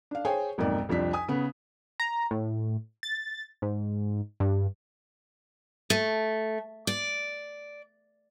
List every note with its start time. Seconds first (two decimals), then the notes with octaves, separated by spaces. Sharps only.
0.11 D4 F5
0.25 G#4 C5 C#5 G5 G#5
0.58 B1 F2 G#2 A#3 D5
0.89 C2 F2 F3 D4 B6
1.13 G#5 D#6
1.28 C#3 B3
2.00 A#5
2.31 A2
3.03 A6
3.62 G#2
4.40 G2
5.90 A3
6.87 D5